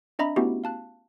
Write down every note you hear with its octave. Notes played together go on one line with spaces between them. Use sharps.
C4 D4 D#5 E5 A#5 B5
A3 B3 C#4 E4 F#4 G4
F5 A5 F#6